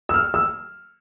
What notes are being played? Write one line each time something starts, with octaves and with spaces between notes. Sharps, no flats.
E6
F6
E6